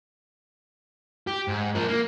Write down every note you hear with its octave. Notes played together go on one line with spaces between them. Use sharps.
G4
G#2
F3 A#4
A#3